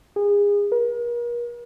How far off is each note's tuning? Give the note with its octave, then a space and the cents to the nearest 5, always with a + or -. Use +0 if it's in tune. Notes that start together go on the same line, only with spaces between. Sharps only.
G#4 -30
A#4 +40